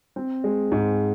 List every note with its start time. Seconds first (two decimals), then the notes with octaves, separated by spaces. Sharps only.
0.16 C4
0.44 G#3
0.72 G#2